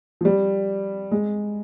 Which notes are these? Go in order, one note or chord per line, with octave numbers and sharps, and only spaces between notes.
F3
G3
G#3